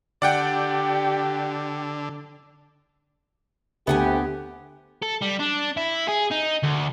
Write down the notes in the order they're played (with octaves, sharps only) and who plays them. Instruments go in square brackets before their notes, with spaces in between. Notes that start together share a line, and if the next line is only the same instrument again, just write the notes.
[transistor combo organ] D3 [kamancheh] G4 [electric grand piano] D5 F#5 G5
[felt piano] D2 [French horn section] C3 A3 G4 [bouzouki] B3 F#5 G#5
[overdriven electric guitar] A4
G3
D4
E4
G#4
D#4
D2